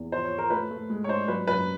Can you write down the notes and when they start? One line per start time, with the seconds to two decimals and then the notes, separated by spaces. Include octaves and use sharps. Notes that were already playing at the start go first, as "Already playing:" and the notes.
Already playing: E2
0.12 F3 C5
0.25 C#5
0.32 F3
0.38 A#4
0.50 A3 B4
0.71 A3
0.90 G#3
1.04 C#5
1.09 D4 C5
1.28 F#3 B4
1.47 F#2 B4